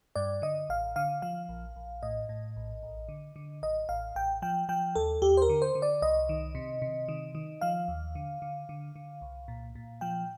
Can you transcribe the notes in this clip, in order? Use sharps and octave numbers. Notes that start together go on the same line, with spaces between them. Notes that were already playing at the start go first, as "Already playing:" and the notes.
G2 D5
D3 D#5
A1 F5
D3 F5
F3 F5
A#1
A#1
A2 D#5
A2
A#1
A1
D3
D3
A1 D#5
A1 F5
A1 G5
F3 G5
F3 G5
D#2 A4
D#2 G4
C5
A#4
D3
C5
D3
D5
C2 D#5
D#3
C3
C3
D#3
D#3
F3 F5
D#2
D3
D3
D3
D3
C2
A#2
A#2
F3 G5